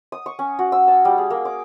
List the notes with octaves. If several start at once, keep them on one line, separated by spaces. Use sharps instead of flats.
D#6
C#6
C#4
F#4
E6
A5
G3
G#4
A#3
D6